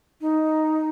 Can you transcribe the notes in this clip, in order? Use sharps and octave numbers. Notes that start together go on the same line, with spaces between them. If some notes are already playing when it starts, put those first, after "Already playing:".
D#4